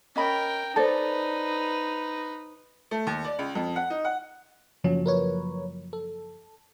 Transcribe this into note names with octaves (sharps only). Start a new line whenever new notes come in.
C#4 A#4 D#5 G5 B5
D#4 A4 B4 C5 D5 A5
A3
D#2
D5
C#2
F2
F#5
D#4
F#5
F#1 F3 F#3 C#4
A#4 B4 C#5
A4